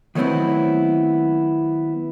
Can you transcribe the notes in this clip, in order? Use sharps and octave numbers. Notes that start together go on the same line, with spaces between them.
D#3 F#3 A3 B3 C4 E4